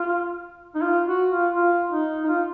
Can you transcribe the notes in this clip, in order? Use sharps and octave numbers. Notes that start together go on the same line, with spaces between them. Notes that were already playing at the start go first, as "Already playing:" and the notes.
Already playing: F4
D#4
F4
F#4
F4
F4
D#4
D#4
F4